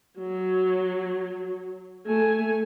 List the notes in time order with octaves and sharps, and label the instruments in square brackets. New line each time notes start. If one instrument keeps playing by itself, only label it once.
[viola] F#3
A3 G#5